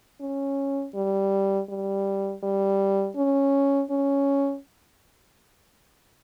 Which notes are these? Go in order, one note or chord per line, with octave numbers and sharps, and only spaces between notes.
C#4
G3
G3
G3
C#4
C#4